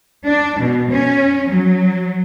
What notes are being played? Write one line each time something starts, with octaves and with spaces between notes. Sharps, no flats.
D4
B2
C#4
F#3